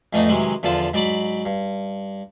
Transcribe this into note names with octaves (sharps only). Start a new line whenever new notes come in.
F2 A2 E3 A3 D4 D#4
C3 D#3 E3 F#3 G#3
E2 D3 F3 F4 A5
G#2 F#3 D5 B5 D6
G2